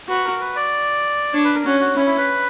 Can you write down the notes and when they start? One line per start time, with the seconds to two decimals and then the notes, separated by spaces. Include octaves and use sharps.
0.08 F#4 B4
0.25 A#4
0.40 B4
0.56 D5
1.33 D4 C#5
1.44 B4
1.55 A#4
1.65 C#4 F#4
1.80 F#4
1.96 C#4 E4
2.06 E4
2.18 B4